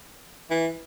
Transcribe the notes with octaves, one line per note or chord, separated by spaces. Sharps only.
E3